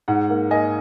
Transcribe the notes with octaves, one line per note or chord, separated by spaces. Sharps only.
G#2 F#5
A#3
A#3 D#5 G#5